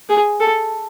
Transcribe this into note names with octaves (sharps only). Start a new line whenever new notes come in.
G#4
A4